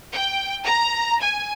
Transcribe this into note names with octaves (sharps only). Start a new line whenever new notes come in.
G5
A#5
G#5